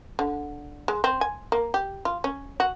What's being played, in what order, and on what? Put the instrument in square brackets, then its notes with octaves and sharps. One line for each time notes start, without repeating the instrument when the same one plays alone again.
[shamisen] D3
G#3
C4
G#5
A#3
G4
F4
C#4
F#4